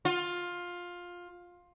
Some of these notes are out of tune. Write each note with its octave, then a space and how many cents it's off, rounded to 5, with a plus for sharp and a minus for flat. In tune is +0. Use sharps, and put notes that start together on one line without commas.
F4 +15